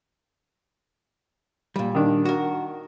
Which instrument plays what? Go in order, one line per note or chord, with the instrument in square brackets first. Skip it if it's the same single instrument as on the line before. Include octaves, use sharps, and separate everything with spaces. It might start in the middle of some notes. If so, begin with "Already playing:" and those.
[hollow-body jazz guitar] A#2 G3
[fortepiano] D#3 D4
[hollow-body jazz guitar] F#4 A#4